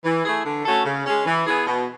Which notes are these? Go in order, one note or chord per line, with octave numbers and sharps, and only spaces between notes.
E3
A3 E4 G#4
D3
A3 C#4 F#4 A4
C#3
G#3 C#4
E3
B3 E4 G#4
B2